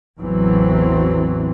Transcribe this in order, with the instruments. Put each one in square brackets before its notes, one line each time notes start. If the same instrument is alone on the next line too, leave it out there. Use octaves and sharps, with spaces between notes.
[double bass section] A1 E2 E3 F#3 C4